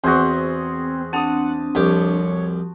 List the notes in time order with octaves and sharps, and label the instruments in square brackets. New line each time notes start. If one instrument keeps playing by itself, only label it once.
[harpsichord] E2 [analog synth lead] C4 [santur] F#4 G#4 C5
[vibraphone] C4 D4 [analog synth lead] F#5 [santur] A5 D#6
[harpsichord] C2 F2 G4 [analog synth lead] C#5